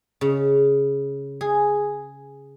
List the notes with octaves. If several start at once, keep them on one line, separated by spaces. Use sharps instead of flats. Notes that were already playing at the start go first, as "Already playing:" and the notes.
C#3
G#4